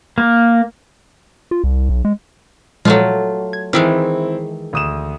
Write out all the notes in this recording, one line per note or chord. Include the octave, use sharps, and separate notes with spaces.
A#3
F4
C2
B1
G#3
A#2 F3 F#3 G#3 A3 F4
G#6
D#3 E3 G#3 C4 E4 E6 F6
D2 D#6 E7